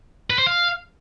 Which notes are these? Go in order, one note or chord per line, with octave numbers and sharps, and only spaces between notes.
B4
C5
F5